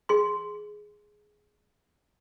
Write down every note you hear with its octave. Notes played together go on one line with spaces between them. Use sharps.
G#4 C6